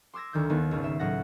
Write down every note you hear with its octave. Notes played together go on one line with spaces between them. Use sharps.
C6 D6 E6 G#6 A#6
D2 D#3 G6
D#2 D#3 B3
G#1 C#2
E5 C7
C#2 A2 F#3 F#5 A#6